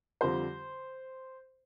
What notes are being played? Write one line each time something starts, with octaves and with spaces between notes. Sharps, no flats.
F2 D3 G3 C5